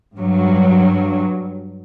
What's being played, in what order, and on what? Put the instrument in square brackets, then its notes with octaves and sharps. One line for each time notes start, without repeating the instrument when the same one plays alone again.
[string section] G2 F#3